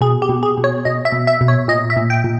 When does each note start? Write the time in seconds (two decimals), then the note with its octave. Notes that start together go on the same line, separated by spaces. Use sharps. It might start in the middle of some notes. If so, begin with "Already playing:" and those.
0.01 B2 G#4
0.22 G4
0.29 B2
0.43 G#4
0.57 B2
0.64 C#5
0.85 B2 D#5
1.05 E5
1.12 B2
1.27 E5
1.41 B2
1.48 C#5
1.68 A#2 D#5
1.90 E5
1.96 A#2
2.10 G5
2.24 A#2